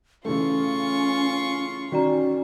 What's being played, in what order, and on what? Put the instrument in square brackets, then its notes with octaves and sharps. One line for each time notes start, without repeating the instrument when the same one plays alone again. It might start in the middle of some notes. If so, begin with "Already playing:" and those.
[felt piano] C#3 E3 A3 [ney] C#4 [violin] F4 C#6
[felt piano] D#3 [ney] C#4 [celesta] F#4 D5 A#5